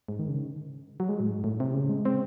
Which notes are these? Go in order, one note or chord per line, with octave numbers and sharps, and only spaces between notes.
G#2
D#3
C#3
F#3
G#3
A2
G#2
A2
C3
C#3
G#3
C4